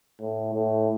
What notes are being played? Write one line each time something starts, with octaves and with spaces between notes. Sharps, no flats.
A2
A2